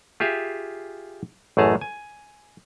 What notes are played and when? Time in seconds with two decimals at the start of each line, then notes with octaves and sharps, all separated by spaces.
0.20 F4 G4 G#4 E5 F5
1.57 A1 F#2 A3 G#4 A5 A#5
1.81 G#5